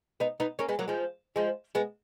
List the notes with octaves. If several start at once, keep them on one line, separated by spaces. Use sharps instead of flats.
B3 D#4
B3 D#4
A#3 C#4
G#3 B3
F#3 A#3
F3 G#3
F3 G#3
G#3 B3